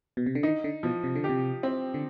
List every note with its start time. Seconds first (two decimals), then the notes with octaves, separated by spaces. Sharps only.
0.17 B2
0.26 C3
0.35 D3
0.43 D#3 D#4
0.64 D3
0.83 B2 F3
1.04 C3
1.16 D3
1.24 G4
1.29 C3
1.63 C4
1.94 D3